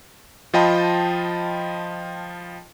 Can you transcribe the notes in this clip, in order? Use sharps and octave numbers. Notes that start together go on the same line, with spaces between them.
F3 F4 D#5 G5 A5 B5